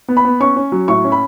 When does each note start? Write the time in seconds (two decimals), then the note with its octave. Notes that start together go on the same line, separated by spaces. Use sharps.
0.08 B3
0.17 B5
0.25 B3
0.40 C#4 C#6
0.56 C#4
0.72 F#3
0.88 A2 C#6
1.04 C#4
1.12 B5